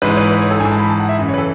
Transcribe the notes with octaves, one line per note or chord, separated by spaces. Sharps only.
G#2 E3 B4
B4
B4
C#5
A4
G#2 G#5
E3
A5
B5
A5
F#5
E5
F#2 C#3 E3
C#5
B4
A4